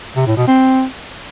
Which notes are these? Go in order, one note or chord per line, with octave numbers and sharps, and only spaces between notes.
C3
A2
B2
C4